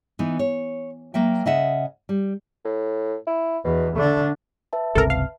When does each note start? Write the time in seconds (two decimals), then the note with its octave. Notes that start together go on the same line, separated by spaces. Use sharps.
0.19 E3 B3 D#4
0.39 C#5
1.14 F#3 A#3 E5 G5
1.46 C#3 D#5 E5 F#5
2.09 G3
2.65 A2
3.27 E4
3.64 E2 B2
3.96 D3 A3 D4
4.73 B4 E5 A5
4.95 G1 C#2 C3 A4 A#4
5.10 F5